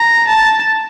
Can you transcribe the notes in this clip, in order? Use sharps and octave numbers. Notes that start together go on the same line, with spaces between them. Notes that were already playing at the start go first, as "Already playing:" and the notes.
Already playing: A#5
A5